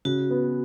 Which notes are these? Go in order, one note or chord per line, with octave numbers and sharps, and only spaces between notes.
C#3 F#4
B3